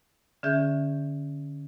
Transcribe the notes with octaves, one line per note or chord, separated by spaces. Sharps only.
D3 C#4 G#4 E5 G6